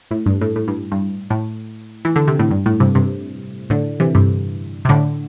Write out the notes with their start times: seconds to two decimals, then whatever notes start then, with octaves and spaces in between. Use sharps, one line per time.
0.11 A2
0.26 G2
0.41 A2
0.56 A2
0.68 G2
0.92 G2
1.30 A2
2.05 E3
2.16 D3
2.27 C3
2.39 A2
2.51 G2
2.66 A2
2.80 G2 C3
2.95 G2 C3
3.70 A2 D3
4.00 C3 E3
4.15 G2 C3
4.85 C3
4.89 A2 D3